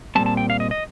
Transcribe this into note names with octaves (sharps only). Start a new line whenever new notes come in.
A#2 G3 C4 A5
A5
G5
F5
D#5
D#5